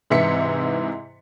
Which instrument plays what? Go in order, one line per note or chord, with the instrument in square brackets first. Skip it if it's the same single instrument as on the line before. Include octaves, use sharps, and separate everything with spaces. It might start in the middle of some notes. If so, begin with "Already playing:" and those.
[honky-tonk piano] G#2 C3 E3 E4 B6 C#7